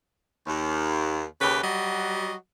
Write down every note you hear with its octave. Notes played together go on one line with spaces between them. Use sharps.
D#2
D#2 C#3 G4 B4
F#3 G3 F#4 D#5